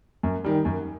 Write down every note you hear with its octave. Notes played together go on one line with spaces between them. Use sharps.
F#2
D#3 G3
F#2